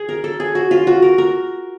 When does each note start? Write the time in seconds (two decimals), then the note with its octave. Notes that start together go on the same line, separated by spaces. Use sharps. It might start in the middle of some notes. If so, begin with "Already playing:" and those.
Already playing: G#4
0.09 A#4
0.24 A4
0.40 G#4
0.55 F#4
0.71 F4
0.87 F#4
1.02 A#4
1.18 A#4